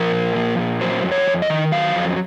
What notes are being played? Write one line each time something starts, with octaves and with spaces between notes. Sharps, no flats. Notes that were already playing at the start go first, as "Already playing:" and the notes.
Already playing: F3 A#4
A#2
F3
A#2
F#3 C5
F2
C#5
F2
D#5
D#3
F#3 F5
F2